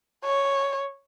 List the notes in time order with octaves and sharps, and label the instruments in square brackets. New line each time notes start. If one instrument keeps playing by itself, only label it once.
[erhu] C#5